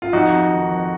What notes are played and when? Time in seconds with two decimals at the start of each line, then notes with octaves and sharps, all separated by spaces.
0.02 F4
0.13 F2 D#4 F#4
0.32 F2
0.52 D#3
0.71 F2